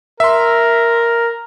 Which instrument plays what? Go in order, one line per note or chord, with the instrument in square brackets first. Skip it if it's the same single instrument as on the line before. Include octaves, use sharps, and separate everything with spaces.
[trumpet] A#4 [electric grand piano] E5 C6